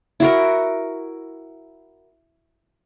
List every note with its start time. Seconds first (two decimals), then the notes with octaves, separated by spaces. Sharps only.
0.20 E4 F#4 A#4